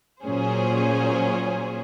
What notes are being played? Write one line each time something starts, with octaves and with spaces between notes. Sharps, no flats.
A#2 F#3 C#4 G#4 C5